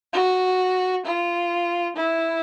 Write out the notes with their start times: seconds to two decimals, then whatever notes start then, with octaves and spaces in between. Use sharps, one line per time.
0.13 F#4
1.05 F4
1.96 E4